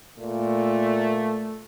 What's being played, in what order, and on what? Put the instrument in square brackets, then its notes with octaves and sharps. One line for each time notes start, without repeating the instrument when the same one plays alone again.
[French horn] A#2 [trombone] A3